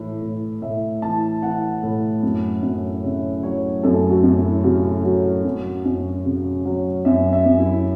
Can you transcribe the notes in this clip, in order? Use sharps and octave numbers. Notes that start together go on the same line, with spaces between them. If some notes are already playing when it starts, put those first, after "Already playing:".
Already playing: A2 E3
A2
A2 E5
E3 A5
E3 F#5
A2
F#2
F#2
C#3 E5
F#3 C#5
F#2 A4
F#4
F#2
E4
C#3 F#4
F#3 F#4
F#2
F#2
C#3
F#3
F#2 E5
E5
F#2
E4